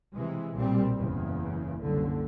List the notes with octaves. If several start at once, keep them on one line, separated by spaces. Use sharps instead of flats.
C3 E3 G#3
B1 A#2 G3 C4
F#1 E2 C#3
F#1 C2 D3